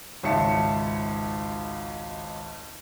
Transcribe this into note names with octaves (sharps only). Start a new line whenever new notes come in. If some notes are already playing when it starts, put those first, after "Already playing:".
G#1 C#2 C#5 E5 A5 C#7